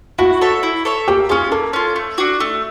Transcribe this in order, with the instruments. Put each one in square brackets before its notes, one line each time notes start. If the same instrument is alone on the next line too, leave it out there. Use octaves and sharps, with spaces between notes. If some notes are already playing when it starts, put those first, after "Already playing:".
[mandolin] E4 [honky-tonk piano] F#4
[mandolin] A4 C#5 E5
E4
A4 C#5 E5
[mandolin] A#3 [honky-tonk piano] G4
[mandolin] C#4 F4 [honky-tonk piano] G#4
[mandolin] A#3 [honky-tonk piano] A4
[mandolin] C#4 F4
A3
D4 F#4
A3